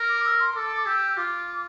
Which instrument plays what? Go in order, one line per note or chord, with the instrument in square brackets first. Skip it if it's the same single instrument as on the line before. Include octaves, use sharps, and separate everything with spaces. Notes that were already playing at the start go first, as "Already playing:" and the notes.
Already playing: [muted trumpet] A#4
[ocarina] D6
E6
C6
[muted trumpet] A4 [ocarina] D6
[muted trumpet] G4 [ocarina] E6
[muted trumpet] F4 [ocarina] D6